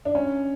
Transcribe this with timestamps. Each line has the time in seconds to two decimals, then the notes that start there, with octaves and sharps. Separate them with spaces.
0.05 D4
0.15 C#4